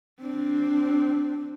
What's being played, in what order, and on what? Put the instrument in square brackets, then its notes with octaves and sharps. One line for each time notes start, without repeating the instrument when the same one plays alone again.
[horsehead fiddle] C4 D4